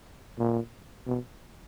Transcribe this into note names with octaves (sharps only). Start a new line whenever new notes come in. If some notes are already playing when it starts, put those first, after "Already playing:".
A#2
B2